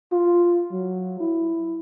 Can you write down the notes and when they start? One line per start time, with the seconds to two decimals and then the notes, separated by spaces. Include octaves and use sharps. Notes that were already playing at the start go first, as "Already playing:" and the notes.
0.12 F4
0.72 F#3
1.20 E4